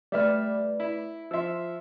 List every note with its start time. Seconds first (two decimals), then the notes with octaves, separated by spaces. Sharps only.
0.12 G3 A3 B4 D5 E5 F6
0.80 E4
1.31 F3 E5 C6 E6